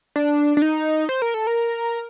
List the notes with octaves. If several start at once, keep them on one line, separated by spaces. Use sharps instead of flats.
D4
D4
D#4
C5
A#4
A4
A#4